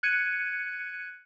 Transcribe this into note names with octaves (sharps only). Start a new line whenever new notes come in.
F#6 G#6 C#7 D#7